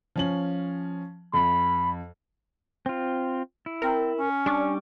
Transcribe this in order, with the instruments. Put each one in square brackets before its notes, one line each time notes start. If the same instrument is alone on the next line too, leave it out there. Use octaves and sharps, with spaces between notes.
[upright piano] F3 C#4 F#7
[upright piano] F2 [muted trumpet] B5
[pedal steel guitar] C4 F4
E4
[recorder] C4 [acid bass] A#4
[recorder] C#4
[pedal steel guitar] G3 C#6 D6 [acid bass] D4